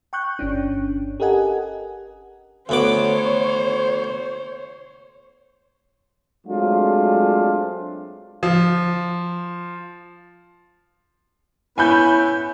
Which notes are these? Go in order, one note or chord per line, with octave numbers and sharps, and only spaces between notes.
G5 C#6 F#6 G6
G1 C#4 D4
G4 A4 A#4 D#5 F#5 G#5
D2 B3 C5 C#5 D6
F#3 G#3 A3 C4 D4 F4
F3
B3 C#4 E4 G#5 B5 G6